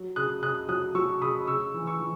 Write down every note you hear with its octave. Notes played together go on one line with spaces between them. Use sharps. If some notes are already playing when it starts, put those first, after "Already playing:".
Already playing: F#3
C#3 D#6 F#6
C#3 D#6 F#6
F#3 D#6 F#6
F#3 C#6 E6
C#3 B5 D#6
C#3 C#6 E6
E3
C#6 E6
E3